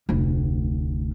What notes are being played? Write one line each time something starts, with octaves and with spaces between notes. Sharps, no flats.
F1 D2